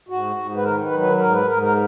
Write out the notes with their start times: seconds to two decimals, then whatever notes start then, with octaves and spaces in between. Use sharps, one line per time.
0.09 G#2 F#4
0.36 G#2
0.56 B4
0.63 D#3 A#4
0.83 B4
0.91 F#3
1.00 B4
1.19 G#2 A#4
1.32 B4
1.46 G#2 A#4
1.63 A#4